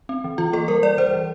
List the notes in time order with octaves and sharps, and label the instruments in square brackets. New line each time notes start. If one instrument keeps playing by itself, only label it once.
[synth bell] C4
E3
E3 F4
A#3 A4
G3 A#4
G3 D5
E3 C5
E3